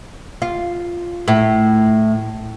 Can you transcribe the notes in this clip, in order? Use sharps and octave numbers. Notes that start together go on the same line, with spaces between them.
F4
A2